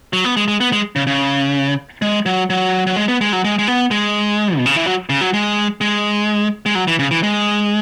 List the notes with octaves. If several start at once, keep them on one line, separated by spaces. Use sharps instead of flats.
F#3
B3
G#3
G#3
B3
G#3
C#3
C#3
G#3
F#3
F#3
F#3
G#3
B3
G#3
F#3
G#3
G#3
B3
G#3
B2
C#3
E3
F#3
C#3
F#3
G#3
G#3
G#3
F#3
E3
C#3
E3
G#3